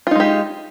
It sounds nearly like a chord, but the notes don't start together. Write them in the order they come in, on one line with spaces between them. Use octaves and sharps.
F4 D#4 G#3 G4